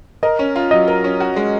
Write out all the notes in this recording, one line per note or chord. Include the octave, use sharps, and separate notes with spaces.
A#4 D#5
C#4
F4
F#3 D#5
A#4
C#4
F#4
G#3